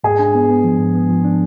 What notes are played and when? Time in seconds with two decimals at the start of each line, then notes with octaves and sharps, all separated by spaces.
0.04 G#2 G#4
0.19 D4
0.35 B3
0.50 B3
0.64 F3
0.79 G#2
0.95 B3
1.09 F3
1.25 D4